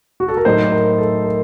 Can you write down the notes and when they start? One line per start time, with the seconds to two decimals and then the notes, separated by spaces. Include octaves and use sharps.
0.20 F#4
0.28 A4
0.37 A#4
0.45 A2 F#3 A3 D#4 C5
0.72 A#4
0.98 A4
1.24 A#4